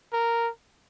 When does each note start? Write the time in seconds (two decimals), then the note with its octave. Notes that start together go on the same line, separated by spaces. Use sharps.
0.13 A#4